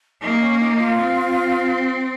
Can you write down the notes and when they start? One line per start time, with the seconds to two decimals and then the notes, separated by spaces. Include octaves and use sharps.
0.21 A#3 D#4
0.40 C#4
0.60 D#4
0.78 F4
0.97 C4